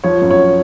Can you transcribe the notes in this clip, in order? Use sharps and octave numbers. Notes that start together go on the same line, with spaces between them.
F3 C#5
F#2
C#5